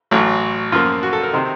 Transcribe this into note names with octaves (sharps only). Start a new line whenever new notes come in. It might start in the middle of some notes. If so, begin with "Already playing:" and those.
A1 A2 F#3
F#2 F3 A#3 F4
F#4
A4
A#4
C3 D#3 C5